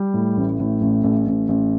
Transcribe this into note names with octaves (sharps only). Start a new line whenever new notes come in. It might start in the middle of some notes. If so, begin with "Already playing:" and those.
Already playing: G3
A2
A1
A2
A1
A1
A1
A1